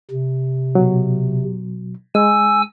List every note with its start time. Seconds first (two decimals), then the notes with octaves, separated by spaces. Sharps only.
0.11 C3
0.75 B2 F#3
2.15 G#3 G#5 E6